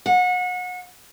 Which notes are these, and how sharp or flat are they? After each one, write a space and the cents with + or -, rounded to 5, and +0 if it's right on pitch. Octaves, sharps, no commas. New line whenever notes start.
F#5 -30